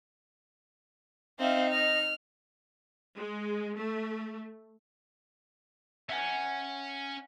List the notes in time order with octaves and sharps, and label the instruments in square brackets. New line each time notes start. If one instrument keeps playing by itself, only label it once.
[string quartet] C4 E5 [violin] D#4 [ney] F5
[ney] D#5 [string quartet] F6
[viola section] G#3
A3
[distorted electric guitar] C#4 [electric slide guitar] E5 F#5 G#5